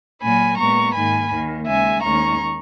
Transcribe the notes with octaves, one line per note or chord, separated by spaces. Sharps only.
A#2 F#3 A#3 G#5 B5
A#2 G#3 B3 A#5 C#6
G#2 D#3 A#3 G#5 B5
D#2 D#3 A#3
D#2 C#3 G#3 E5 G#5
D#2 D#3 G#3 C#4 A#5 C#6